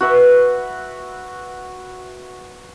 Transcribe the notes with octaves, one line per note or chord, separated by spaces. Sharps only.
F#4 B4 E5